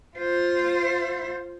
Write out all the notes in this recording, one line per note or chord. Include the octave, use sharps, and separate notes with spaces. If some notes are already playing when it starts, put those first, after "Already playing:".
F4 C5